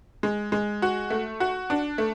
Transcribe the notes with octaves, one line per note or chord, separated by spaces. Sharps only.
G#3
G#3
F#4
A3
F#4
D4
A3